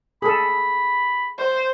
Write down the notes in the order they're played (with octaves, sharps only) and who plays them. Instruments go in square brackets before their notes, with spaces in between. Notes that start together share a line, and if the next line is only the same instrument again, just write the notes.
[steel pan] G#4 A4 [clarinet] B5
[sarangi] C5